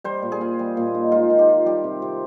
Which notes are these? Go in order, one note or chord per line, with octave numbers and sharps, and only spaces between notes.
G3 C5
A#2
G#4
F4
G3
A#2
D#4
G#3 F4
D#3
G4
F4
G3 G4
C3
C3